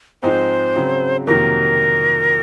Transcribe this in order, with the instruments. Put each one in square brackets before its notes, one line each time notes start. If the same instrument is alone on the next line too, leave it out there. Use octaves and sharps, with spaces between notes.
[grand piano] G#2 F3 G#3 C4 D#4 [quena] C5
[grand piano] C#3 F#3 C4
[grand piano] F2 C3 D#3 F#3 A#3 [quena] A#4